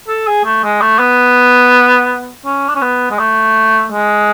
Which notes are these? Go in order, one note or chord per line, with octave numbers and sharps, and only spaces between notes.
A4
G#4
A3
G#3
A3
B3
C#4
D4
C#4
B3
G#3
A3
G#3